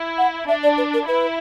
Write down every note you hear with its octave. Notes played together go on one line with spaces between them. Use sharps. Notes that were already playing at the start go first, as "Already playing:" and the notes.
Already playing: E4
F#5
D4 E5
D5
B4
A#4
E4 B4